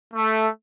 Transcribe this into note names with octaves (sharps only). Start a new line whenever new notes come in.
A3